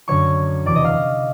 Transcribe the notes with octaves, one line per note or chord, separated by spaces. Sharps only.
F#2 D3 F#3 C#5 C#6
F#1 E2 C3 E3 D5 D6
D#5 D#6
F5 F6